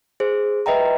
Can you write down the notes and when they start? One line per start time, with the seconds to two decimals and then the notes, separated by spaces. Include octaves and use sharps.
0.20 G#4 C5
0.66 B4 D#5 E5 G5 A#5